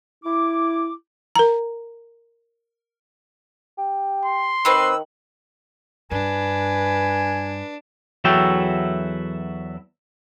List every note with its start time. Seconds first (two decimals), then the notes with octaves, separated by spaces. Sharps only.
0.24 E4 D6
1.36 A#4 A#5
3.78 G4
4.26 C6
4.65 D#3 C4 C#4 B4 E6
6.11 G2 D4 B4 G#5
8.24 E2 F#3 E4 F#4 A4 G5